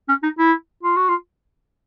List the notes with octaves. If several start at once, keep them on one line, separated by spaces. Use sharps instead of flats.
C#4
D#4
E4
F4
F#4
F4